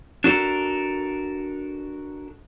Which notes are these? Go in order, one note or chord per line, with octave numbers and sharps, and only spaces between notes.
D4 F#4 A4 A#4